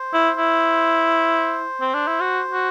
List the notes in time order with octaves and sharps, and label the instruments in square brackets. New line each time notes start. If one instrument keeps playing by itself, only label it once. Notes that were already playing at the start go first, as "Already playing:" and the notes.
Already playing: [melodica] C5
[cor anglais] E4
E4
C4
D4
E4
F#4
F#4